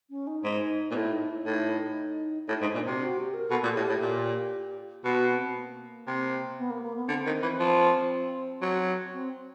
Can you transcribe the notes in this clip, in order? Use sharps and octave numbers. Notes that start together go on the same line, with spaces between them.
C#4
D#4
G#2
A#2
A2 E4
D#4
E4
A2 D#4
A2 D#4
G#2 D4
D#4
A#2 D4
C3 F#4
F#4
G4
A#4
B2 A4
A#2
A2 G4
A2
A#2
B2 F#4
C4
A#3
C3
B3
A#3
A#3
B3
D3 C4
D#3
E3
F3
F#3
C4